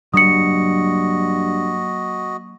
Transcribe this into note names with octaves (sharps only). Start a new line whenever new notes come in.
G2 F#3 A#3 D4 F#4 D#5 D#6 C#7